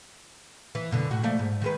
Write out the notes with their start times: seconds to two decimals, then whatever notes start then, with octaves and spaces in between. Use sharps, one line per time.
0.75 E3
0.91 F#2 B2 D3
1.11 A2 F#4
1.23 F3 A3 D5
1.39 G#2
1.62 D#3 G#3 B4